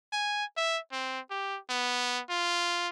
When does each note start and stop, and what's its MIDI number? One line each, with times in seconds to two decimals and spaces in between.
0.12 0.44 80
0.57 0.78 76
0.92 1.20 60
1.30 1.58 67
1.70 2.21 59
2.29 2.88 65